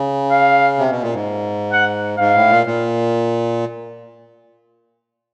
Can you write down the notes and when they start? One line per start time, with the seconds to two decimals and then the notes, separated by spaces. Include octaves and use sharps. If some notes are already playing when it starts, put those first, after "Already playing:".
Already playing: C#3
0.31 F5
0.78 C3
0.90 B2
1.02 A#2
1.14 G#2
1.73 F#5
2.18 G#2 F5
2.35 A2
2.50 A#2
2.67 A#2